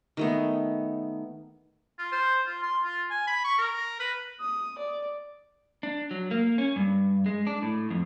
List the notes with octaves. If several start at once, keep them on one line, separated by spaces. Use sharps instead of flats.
D#3 A3 B3
F4
C5
F4
C6
F4
G#5
B5
C#6
A#4
B4
D#6
D5
D4
F#3
A#3
C#4
G2
G#3
D4
A2
F2